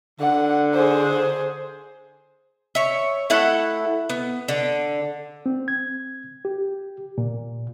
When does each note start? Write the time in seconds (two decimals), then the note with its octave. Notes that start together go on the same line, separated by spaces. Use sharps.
0.20 D3 F#5
0.73 G#4 C5
2.75 C#5 E5
3.30 A3 E4 A4 F#5
4.10 B3
4.48 D3
5.46 C4
5.68 G#6
6.45 G4
7.18 A#2